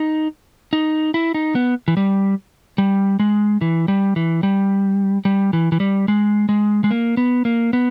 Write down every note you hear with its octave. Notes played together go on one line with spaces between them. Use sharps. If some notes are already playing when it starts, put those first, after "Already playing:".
Already playing: D#4
D#4
E4
D#4
B3
E3
G3
G3
G#3
E3
G3
E3
G3
G3
E3
E3
G3
G#3
G#3
G#3
A#3
B3
A#3
B3